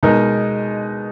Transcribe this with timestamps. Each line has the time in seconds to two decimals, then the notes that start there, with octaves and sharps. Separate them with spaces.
0.03 B2 G#3 D#4 A#4